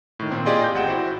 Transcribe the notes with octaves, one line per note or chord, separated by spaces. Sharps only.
A2 D#3
A#2 C4
F4 G4 G#4 D5 D#5 C6
G6 A#6
A1 F#5 G5 E7
E4 F#4 C5